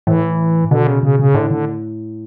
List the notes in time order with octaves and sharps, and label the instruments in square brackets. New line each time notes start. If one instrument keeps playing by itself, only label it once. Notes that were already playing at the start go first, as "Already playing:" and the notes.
[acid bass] A2 [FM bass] E3
[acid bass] B2 [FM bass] D3
[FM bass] C#3
C#3
C#3
[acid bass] A2 [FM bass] D3
[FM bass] D3